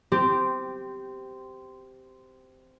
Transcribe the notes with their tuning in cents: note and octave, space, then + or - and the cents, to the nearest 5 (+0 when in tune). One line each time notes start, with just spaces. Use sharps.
C4 -15 G4 +0